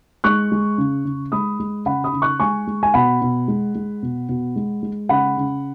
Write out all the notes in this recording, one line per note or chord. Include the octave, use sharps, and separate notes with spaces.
G#3 C#6 F#6
G#3
C#3
C#3
G#3 B5 D#6
G#3
C#3 F#5 B5
B5 D#6
C#3
C#6 F#6
G#3 G#5 C#6
G#3
G#5
B2 F#5 B5
B2
G#3
G#3
B2
B2
G#3
G#3
C#3 F#5 B5
C#3